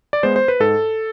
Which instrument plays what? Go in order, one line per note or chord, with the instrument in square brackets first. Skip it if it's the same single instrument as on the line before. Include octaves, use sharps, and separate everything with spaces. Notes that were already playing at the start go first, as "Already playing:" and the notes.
[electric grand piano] D5
G#3 B3 C5
C5
B4
G#2 A4